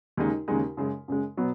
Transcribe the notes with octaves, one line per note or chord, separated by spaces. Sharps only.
D#2 C#3 G#3 D#4
D#2 C#3 G#3 D#4
F#2 C#3 G#3
F#2 C#3 G#3
B2 F#3 B3